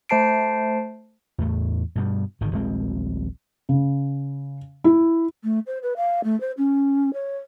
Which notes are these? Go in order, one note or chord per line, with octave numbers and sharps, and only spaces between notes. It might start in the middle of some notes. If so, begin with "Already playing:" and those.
A3 C5 A5 C7 D7
E2 A2 A3
G2 B2 G3
G#1 D3 D#3
D#1 A#1 G#3 C4
C#3
E4
A3
C5
B4
F5
A3
C5
C#4
C#5